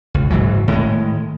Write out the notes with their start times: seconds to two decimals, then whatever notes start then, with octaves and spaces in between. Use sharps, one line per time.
0.14 C#2
0.30 F#1 G#2 E3 F#3
0.68 A2 D#3 G3 G#3